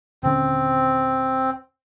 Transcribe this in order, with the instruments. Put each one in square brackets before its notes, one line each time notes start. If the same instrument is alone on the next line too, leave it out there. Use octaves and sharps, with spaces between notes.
[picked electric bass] D#1 D3 C#4 [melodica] C4